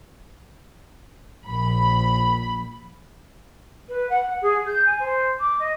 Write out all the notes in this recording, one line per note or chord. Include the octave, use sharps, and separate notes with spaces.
A#1 B5
B4
F#5
G#4
G6
G#5
C5
D6
D#5